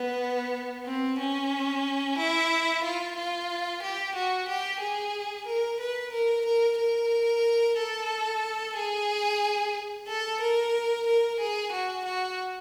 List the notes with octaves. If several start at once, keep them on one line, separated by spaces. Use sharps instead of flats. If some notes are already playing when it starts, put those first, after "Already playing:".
Already playing: B3
C4
C#4
E4
F4
F4
G4
F#4
G4
G#4
A#4
B4
A#4
A#4
A#4
A4
G#4
A4
A#4
A#4
G#4
F#4
F#4